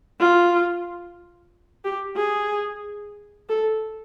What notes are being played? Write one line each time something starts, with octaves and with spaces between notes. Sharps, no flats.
F4
G4
G#4
A4